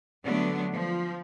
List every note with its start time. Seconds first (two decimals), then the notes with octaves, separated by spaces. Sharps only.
0.24 D3 F#3 G3 A3 B3 D4
0.73 F3